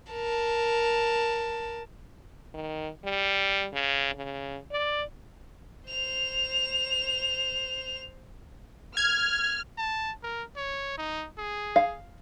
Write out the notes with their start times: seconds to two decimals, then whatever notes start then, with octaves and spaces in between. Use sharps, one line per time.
0.12 A#4 A5
2.54 D#3
3.05 G3
3.73 C#3
4.15 C#3
4.71 D5
5.89 C5 F7
8.97 F6 G#6
9.78 A5
10.23 A#4
10.56 C#5
10.98 D#4
11.38 G#4
11.76 F5